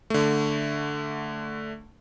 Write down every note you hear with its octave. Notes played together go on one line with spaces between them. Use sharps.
D3 A3